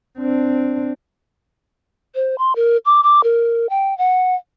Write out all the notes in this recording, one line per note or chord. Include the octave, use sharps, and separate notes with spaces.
C4 D4
C5
C6
A#4
D6
D6
A#4
G5
F#5